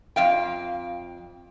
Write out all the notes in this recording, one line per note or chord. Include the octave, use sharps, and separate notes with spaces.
F2 F5 G5